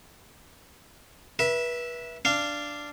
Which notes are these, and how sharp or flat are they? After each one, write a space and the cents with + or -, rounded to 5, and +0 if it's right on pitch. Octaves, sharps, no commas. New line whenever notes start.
B4 -30 E5 +0
D4 +0 F5 -20